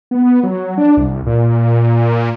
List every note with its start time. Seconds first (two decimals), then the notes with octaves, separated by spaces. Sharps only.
0.11 B3
0.43 F#3
0.78 D4
0.97 C2
1.27 A#2